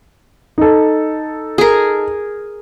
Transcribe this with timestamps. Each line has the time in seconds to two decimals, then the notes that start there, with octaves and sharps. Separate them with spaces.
0.58 D#4 A4
1.58 G#4 A#4